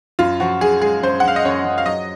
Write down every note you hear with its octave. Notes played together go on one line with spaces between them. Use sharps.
F#2 F4
F3 F#4
F#2 G#4
G#3 G#4
F#2 C5
F#5
F#2 F5
D#5
F#2 C#5
F#2
F5
F#3 D#5